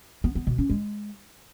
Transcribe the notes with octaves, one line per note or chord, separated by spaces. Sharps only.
B3
B3
B2
C#4
G#3